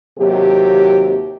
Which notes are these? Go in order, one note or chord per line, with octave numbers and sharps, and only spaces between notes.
D#2 C3 F#3 G4